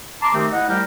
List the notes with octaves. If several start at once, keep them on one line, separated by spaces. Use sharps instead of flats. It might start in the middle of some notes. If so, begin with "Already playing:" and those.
A5 A#5 C6 D6
D#3 A3 C4 D#4 G4
E4 D#5 F#5
G3 A3 G4 A#4 C5